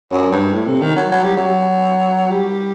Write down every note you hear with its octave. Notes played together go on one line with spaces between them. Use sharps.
F#2
G2
A2
C3
D#3
F#3
F#3
G3
F#3
G3